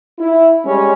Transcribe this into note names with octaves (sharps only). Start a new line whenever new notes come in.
E4
G3 G#3 C#4